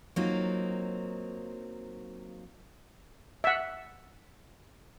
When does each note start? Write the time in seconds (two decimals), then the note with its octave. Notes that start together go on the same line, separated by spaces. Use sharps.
0.16 F#3 A#3 C4 D#4 F4
3.44 E5 F#5